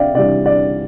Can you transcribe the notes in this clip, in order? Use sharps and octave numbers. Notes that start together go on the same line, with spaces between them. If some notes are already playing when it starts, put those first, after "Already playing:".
Already playing: C3 D5 E5 F5 G5
C3 E3 G3 D5
D5